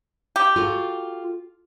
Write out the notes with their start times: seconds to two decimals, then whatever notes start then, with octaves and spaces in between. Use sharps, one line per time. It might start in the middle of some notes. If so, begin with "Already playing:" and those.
0.36 G4
0.56 F4 F#4 A4